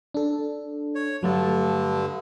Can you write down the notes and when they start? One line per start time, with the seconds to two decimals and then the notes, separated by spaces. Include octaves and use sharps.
0.14 D4 A4
0.95 C#5
1.23 G2 D3 F#3 A3 A5